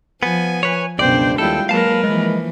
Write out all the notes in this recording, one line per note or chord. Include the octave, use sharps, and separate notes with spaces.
F3 B3 G#5
B4 C#5
C#2 F#2 B2 D4 C5 D5 G5
D#2 G3 G#3 E4 F4 A4 G5
F#3 G#3 A#3 A#4 B4 F5 A5
E3 F3 G#3 A#3